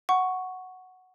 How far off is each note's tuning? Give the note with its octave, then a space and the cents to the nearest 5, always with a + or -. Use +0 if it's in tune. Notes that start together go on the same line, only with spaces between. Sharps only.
F#5 +0 C#6 +0